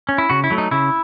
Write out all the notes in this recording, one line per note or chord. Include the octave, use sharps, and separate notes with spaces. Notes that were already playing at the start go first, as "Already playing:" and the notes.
C#4
E4
C#3 F#4
E4
F#3 A3
D#4
C#3 E4